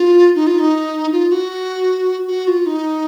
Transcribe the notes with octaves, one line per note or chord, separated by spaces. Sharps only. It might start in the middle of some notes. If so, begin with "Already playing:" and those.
Already playing: F4
D#4
F4
D#4
F4
F#4
F#4
F4
D#4